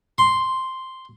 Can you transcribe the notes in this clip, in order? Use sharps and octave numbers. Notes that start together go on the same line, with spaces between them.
C6